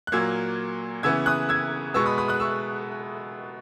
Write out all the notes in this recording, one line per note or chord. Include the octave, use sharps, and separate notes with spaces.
F#6
A#2 F#3 A#3 E6 G#6
C#3 E3 B3 E6 G#6
D#6 F#6
E6 G#6
B2 G#3 B3 C#6 E6
B5 D#6
B5 D#6
D#6 F#6
C#6 E6